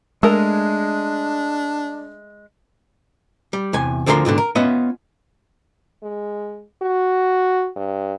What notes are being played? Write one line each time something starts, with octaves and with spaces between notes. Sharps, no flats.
G#3 A3 D4 A#4
G3
E2 C3 G#5
D2 D3 F3 A4 A#4 C6
C2 G#2 B2 D3
A#4
B3 C#4 F4 D#5 E5
G#3
F#4
G2